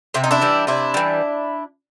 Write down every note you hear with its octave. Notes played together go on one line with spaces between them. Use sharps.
C3 E4
D#4
D4 E4
E3 G3
C3 D4 E4
E3 G3